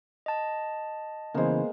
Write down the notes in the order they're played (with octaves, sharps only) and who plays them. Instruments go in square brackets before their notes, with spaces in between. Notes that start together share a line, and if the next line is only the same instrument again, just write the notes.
[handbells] D#5 A5
[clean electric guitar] C#3 E3 [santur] G#3 A#3 [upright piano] B3 C5